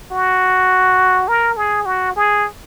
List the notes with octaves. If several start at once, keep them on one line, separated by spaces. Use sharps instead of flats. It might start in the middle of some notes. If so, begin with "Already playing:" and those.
F#4
A#4
G#4
F#4
G#4